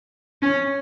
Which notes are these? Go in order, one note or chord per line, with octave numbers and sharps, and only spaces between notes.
C#4